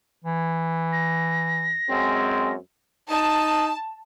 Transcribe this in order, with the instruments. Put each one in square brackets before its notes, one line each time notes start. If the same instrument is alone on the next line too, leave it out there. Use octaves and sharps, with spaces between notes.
[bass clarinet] E3
[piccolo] A#6
[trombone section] F#2 G#3 C4
[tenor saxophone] D#4 [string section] A5